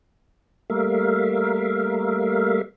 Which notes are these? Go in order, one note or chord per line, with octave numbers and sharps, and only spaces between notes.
G3 A3 A#3 A#4 E5 F5